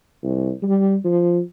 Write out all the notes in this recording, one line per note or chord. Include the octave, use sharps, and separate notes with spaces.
C2
G3
F3